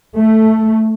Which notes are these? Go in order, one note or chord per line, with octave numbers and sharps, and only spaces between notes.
A3